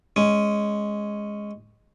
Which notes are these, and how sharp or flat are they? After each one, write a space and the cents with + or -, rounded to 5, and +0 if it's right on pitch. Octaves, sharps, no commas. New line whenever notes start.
G#3 +0 C#4 +0